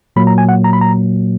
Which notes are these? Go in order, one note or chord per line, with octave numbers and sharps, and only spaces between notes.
A#2 F#3 A#3 B5
A#5
G#5
F#5
A#5
B5
A#5